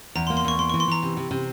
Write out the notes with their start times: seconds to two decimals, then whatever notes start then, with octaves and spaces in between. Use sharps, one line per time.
0.15 E2 A#5
0.27 C6
0.30 A#3
0.37 C6
0.44 E2 C#6
0.58 A#3 C6
0.70 C#6
0.74 E3
0.80 C6
0.88 E3 A#5
1.03 C3
1.17 C3
1.31 C3